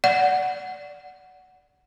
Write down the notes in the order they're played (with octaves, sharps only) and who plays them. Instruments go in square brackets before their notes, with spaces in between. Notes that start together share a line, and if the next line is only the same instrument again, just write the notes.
[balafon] D5 F#5